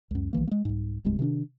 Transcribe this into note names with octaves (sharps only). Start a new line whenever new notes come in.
C#2 F#2
B1 D#3 E3 A#3
G#3 A#3
C2 G#2
D1 C2 G2 G#3
C3 D#3 C#4 D4